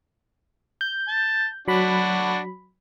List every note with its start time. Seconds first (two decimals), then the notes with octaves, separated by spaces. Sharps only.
0.81 G6
1.08 A5
1.68 F#3 D4 F#4 B5